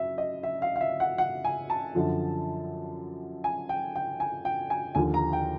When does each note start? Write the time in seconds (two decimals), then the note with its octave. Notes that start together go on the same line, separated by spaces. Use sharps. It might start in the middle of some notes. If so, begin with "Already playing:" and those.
Already playing: F#2 E5
0.18 D#5
0.43 E5
0.62 F5
0.76 F5
0.81 E5
1.00 F#5
1.18 F#5
1.45 G#5
1.70 A5
1.95 F#2 D3 F3
3.44 G#5
3.69 G5
3.96 G5
4.20 G#5
4.45 G5
4.70 G#5
4.95 D#2 D3 F3 G#5
5.14 A#5
5.33 G5